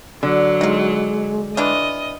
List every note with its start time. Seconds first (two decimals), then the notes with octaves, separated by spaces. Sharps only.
0.23 D3 F#3
0.61 G#3 D#4 F4
1.57 E3 D4 F4 D#5